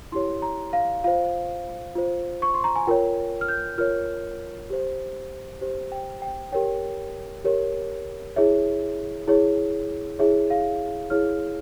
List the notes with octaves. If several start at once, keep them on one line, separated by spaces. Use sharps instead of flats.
E4 G4 C#5 C6
A#5
F5
F4 C5 F5
F4 C5
C#6
C6
A#5
G#5
F4 A#4 C#5 G5
F6
G6
F4 A#4 C#5 F6
G4 C5
G4 C5
G5
G5
G4 A#4 C#5 G5
G4 A#4 C#5
E4 G#4 C#5 E5
E4 G#4 C#5
E4 G#4 C#5 E5
F5
E4 G#4 C#5 F6